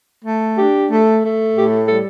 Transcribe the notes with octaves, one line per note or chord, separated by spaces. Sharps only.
A3
D4 G4
A3
A3
A2 G4
G3 A4